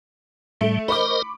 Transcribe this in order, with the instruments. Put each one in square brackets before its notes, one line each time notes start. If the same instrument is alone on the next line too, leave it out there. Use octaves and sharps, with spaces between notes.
[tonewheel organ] A2 G3 [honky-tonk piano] A3
[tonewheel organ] A#4 C5 D#5 [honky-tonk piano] B5 C#6 D6